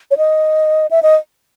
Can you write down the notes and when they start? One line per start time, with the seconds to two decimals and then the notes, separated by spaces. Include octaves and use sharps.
0.11 C#5
0.18 D#5
0.91 E5
1.03 D#5